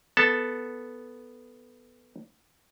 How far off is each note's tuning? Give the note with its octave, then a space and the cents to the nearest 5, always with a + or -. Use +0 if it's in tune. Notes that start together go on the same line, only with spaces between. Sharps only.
B3 +0 A4 +0 A5 +0